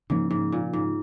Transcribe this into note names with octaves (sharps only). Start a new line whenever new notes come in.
G#2 C#3 F3 A#3 C#4
G#2
A#2
G#2